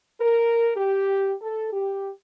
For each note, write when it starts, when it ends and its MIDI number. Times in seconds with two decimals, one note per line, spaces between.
0.20 0.70 70
0.76 1.33 67
1.41 1.69 69
1.73 2.10 67